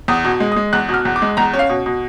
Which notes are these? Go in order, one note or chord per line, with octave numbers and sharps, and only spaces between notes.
E2 D#6
B2
G#3
D#6
G#3
E2 F#6
B2
F6
E2
D6
G#3
E2 A#5
C#4
F5
B2
B2